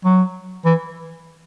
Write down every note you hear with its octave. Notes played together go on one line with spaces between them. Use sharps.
F#3
E3